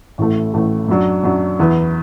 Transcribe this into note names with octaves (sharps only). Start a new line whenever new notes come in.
A1 A2 A3
A1 A2 A3
F#2 F#3 D4
F#2 F#3 D4
E2 E3 B3 E4